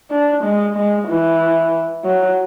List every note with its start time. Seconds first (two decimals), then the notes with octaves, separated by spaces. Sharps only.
0.11 D4
0.44 G#3
0.76 G#3
1.08 E3
2.05 F#3